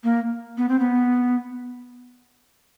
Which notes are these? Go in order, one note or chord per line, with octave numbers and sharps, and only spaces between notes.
A#3
B3
C4
B3